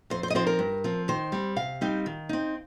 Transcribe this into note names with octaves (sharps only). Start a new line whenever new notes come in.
F2 C5
C5
D#5
F3 C4 D#4 C5
A#4
G2
F3 C4
D#3 C5
G3 C4
C3 F5
G3 C4 D#4
D#3
C4 D#4